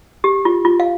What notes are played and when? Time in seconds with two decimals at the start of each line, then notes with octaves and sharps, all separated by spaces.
0.24 G4
0.45 F4
0.65 F4
0.80 F5